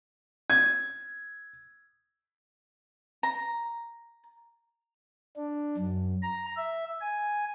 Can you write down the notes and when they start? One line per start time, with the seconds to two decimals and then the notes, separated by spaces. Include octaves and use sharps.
0.50 G#6
3.23 A#5
5.37 D4
5.77 F#2
6.22 A#5
6.57 E5
7.01 G#5